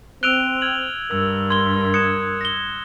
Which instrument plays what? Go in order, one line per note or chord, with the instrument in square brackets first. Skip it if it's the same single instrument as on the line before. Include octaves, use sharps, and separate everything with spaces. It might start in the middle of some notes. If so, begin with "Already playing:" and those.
[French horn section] C4 [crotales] E6 F7 G7 [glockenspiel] F#6 D7 D#7
[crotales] F6 G#6 F#7
[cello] G2 [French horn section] A#4 [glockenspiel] E6
[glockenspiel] C6 G7 [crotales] G#6
[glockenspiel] D#6 G#6 C#7 [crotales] F#6 E7
[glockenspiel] A#6 G7